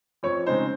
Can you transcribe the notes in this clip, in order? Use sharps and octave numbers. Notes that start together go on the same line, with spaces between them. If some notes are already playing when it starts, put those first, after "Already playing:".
F2 C#5
C#3 G#3 C4 D#4 C5